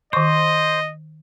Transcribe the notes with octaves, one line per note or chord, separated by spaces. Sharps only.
D#3 C5 D#5 C#6